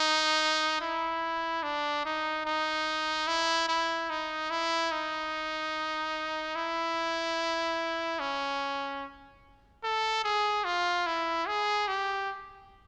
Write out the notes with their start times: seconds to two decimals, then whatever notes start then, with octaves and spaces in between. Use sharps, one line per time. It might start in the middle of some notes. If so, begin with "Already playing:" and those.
Already playing: D#4
0.81 E4
1.63 D4
2.05 D#4
2.46 D#4
3.28 E4
3.68 E4
4.10 D#4
4.50 E4
4.92 D#4
6.55 E4
8.19 C#4
9.84 A4
10.24 G#4
10.65 F4
11.07 E4
11.47 G#4
11.88 G4